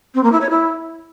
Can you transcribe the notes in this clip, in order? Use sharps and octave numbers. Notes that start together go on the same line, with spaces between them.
C4
A#3
E4
C#5
E4